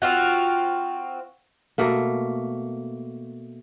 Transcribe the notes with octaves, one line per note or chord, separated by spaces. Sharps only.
C4 F4 F#4
B2 A3 A#3